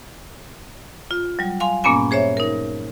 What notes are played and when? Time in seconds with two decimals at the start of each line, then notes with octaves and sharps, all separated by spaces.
1.11 F4
1.39 F#3 G3
1.60 F5 G#5 C6
1.84 G2 A#2 A#3 B3 C#4 G#5
2.11 G#4 C5 C#5 E5
2.37 D#4 A#4